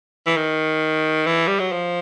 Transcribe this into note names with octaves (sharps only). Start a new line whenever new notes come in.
E3
D#3
E3
G3
F#3
F3